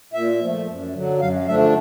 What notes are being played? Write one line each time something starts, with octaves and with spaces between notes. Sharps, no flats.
A#2 E5
F3 A3
F#2
D3 F#3
F#2 F5
D3 F3 A3 D4 E5